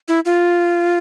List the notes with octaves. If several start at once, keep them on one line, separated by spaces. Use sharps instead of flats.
E4
F4